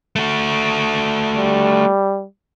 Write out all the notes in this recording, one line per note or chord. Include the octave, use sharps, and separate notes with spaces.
A3 F#4
G3